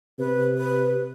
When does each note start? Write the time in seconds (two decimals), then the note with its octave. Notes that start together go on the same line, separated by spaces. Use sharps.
0.19 C3 B4
0.57 B4